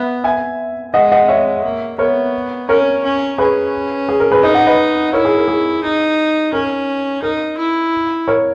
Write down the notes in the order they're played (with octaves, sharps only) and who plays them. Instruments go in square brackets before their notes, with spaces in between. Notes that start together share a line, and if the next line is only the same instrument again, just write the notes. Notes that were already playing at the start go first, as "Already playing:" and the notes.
Already playing: [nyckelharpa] B3 [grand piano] E5
[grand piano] E5 G#5
[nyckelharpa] G#3 [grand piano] D#5 F#5
[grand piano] D#5 F#5
C#5 E5
[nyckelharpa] A#3
[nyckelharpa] B3 [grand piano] A#4 C#5
[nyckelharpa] C#4 [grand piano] A#4 C#5
[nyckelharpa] C#4
[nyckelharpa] C#4 [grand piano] G#4 B4
[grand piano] G#4
A#4
G#4 B4
[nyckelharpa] D#4 [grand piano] B4 D#5
[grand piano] D#5 F#5
B4 D#5
[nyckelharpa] E4 [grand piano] A#4 C#5
[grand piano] G#4
A#4
G#4
[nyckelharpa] D#4
[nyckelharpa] C#4 [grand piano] A#4
[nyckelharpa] D#4 [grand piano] A#4
[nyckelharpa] E4
[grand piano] A#4 C#5